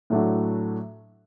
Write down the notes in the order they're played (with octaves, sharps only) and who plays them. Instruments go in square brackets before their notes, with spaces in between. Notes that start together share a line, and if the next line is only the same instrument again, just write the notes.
[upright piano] A2 F#3 A3 D4 F#4